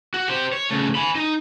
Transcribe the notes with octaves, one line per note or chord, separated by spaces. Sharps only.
F#4
G4 C5
C#5
C#3 A3
G#5 B5
D#4